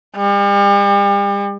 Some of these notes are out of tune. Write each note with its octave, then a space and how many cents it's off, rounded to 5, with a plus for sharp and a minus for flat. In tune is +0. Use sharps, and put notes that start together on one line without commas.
G3 +40